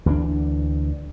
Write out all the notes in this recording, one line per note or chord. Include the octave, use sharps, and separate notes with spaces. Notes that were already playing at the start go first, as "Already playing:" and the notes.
D2 E3 F3 D4